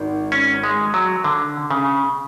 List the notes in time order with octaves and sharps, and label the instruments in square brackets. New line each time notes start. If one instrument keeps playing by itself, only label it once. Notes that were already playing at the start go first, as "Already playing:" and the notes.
Already playing: [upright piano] G#1
[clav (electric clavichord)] C#4
G#3
F#3
D3
C#3